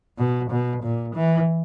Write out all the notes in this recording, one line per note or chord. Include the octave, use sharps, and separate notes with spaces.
B2
B2
A#2
E3